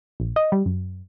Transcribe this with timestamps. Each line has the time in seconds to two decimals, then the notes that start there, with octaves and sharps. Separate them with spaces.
0.20 A#1
0.36 D#5
0.52 G3
0.66 F#2